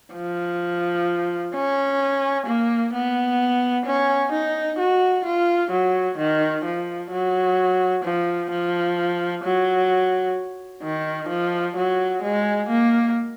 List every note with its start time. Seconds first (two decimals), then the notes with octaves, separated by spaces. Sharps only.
0.15 F3
1.54 C#4
2.47 A#3
2.94 B3
3.86 C#4
4.33 D#4
4.79 F#4
5.25 F4
5.72 F#3
6.18 D#3
6.65 F3
7.12 F#3
8.05 F3
8.51 F3
9.44 F#3
10.83 D#3
11.29 F3
11.77 F#3
12.23 G#3
12.69 A#3